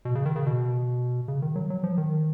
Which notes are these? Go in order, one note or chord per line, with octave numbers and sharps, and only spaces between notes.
B2
C#3
D#3
C#3
B2
C#3
D#3
F#3
F#3
F3
D#3